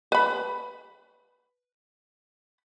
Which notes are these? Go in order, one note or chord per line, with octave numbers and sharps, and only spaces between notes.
B4 B5